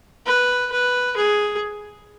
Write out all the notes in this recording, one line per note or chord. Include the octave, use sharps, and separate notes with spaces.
B4
B4
G#4